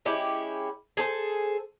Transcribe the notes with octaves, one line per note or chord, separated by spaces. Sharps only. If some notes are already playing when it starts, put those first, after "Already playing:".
G#3 C#4 E4 G4
G#4 A4 C5